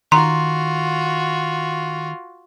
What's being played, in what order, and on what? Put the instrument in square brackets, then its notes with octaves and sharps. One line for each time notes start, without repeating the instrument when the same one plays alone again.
[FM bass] D#3 [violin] F4 F#4 [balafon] A#5 [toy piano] C6